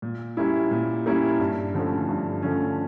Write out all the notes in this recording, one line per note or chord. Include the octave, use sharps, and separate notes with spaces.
A#2
G3 A#3 C#4 E4
A#2
G3 A#3 C#4 E4
G2
D3 F3 A3 C#4
G2
D3 F3 A3 C#4